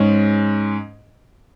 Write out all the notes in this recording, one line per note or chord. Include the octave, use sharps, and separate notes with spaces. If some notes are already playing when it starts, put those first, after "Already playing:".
Already playing: G#2 G#3 C#4